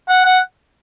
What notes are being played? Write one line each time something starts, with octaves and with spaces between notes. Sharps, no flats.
F#5
F#5